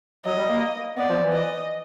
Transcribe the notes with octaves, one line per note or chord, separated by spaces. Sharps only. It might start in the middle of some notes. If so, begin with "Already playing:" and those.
F#3 D#5
G3
A#3
B3 D5
F3
E3
D#5